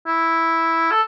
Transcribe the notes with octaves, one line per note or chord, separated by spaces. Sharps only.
E4
A4